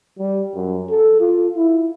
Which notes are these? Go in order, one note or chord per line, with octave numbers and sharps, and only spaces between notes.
G3
F#2
A4
F4
E4